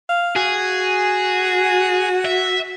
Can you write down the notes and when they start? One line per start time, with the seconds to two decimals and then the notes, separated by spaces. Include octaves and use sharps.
0.09 F5
0.36 F#4 G#4
2.25 E5